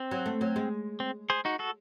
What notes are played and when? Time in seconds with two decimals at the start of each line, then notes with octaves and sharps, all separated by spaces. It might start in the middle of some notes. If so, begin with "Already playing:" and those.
Already playing: C4
0.11 F#3
0.26 A3
0.41 F#3
0.56 G#3
1.00 C4
1.30 G#4 C5
1.45 D#4 F#4
1.59 F#4 A4